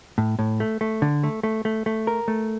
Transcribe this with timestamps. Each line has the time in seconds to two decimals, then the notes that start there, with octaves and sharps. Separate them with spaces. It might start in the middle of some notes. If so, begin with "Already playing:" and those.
0.18 A2
0.39 A2
0.60 A3
0.81 A3
1.02 D3
1.23 A3
1.43 A3
1.65 A3
1.86 A3
2.07 A#4
2.28 A3